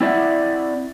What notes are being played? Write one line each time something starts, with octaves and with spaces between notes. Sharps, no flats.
C4 E4 D5 E5 F#5